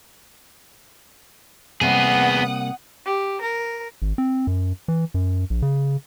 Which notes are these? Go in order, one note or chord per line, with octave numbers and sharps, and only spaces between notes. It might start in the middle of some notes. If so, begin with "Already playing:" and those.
C3 G3 A#3 B3 G#4 F#5 D#6
G4
A#4
G#1
C4
F#2
E3
F#2
A#1
C#3